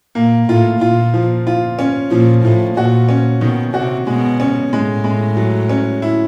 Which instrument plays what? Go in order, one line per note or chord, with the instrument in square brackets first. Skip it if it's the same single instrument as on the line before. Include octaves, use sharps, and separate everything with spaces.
[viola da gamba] A#2 [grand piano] A#3
[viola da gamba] A2 [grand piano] F4
[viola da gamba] A#2 [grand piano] F4
[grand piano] F3
F4
C#4
[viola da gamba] A#2 [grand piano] F3
[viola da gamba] A2 [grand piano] F3
[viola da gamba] A#2 [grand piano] F#4
[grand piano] C#4
[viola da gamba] B2 [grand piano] D#3
[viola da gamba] C3 [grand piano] F#4
[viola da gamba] B2 [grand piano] G#3
[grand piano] C#4
[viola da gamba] A2 [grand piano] G#3
[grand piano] G#3
F#3
C#4
E4